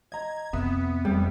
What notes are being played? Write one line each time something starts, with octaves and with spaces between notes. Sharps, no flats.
D#5 A#5 G#6
F2 C3 B3 E5 D#6
F1 G3